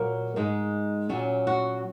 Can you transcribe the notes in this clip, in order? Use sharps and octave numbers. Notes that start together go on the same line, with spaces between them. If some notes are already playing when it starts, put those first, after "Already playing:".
Already playing: A#2 F#3 A#3 A#4
G#2 G#3 D#4
A#2 F#3 C#4
F#4